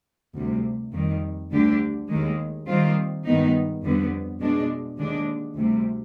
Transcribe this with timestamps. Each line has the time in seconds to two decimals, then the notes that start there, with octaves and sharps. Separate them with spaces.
0.35 D2 C3 G3
0.92 F2 D#3 G3
1.51 D2 D3 G3 D4 G4
2.08 D#2 D#3 G#3
2.67 D#3 G3 C4 F4
3.24 G2 D#3 G#3 B3 D#4
3.82 F2 D3 G3 B3
4.39 B2 G#3 D4
4.98 D#2 D3 G#3 D4
5.56 D2 C3 G3